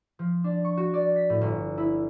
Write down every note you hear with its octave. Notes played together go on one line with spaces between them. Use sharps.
F3
D4
C#6
F#4
D5
B6
A2
G1
E4